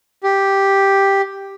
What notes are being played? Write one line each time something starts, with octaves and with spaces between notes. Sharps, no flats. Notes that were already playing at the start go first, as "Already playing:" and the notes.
G4